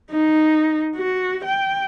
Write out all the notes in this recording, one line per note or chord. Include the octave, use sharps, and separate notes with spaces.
D#4
F#4
G5